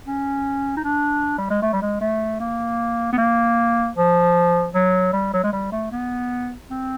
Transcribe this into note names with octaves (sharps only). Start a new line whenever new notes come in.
C#4
D#4
D4
G3
G#3
A3
G3
G#3
A3
A#3
B3
A#3
F3
F#3
G3
F#3
G#3
G3
A3
B3
C4